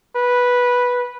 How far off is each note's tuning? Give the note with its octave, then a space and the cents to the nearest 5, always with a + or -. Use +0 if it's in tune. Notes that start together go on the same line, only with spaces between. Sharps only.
B4 -5